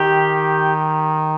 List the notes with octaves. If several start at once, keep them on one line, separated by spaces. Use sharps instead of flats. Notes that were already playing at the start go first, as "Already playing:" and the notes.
Already playing: D#3 G4